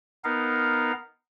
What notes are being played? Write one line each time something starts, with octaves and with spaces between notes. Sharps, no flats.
B3 D#4 A#4 F5